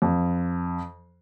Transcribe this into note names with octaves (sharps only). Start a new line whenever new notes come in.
F2